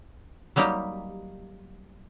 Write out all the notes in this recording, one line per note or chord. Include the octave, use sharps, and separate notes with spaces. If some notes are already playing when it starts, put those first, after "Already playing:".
F#3 G3 A#3 D#4 G4